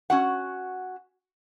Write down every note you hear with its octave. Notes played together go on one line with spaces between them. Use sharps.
C#4 F#4 F#5